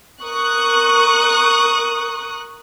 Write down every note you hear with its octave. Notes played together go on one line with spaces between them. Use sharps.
A#4 C#6 D#6 F#6